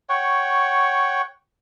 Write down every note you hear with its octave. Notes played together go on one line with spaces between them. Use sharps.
C#5 F#5 G5 C#6